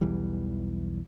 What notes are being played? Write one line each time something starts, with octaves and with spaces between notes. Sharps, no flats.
B1 E2 E3 G3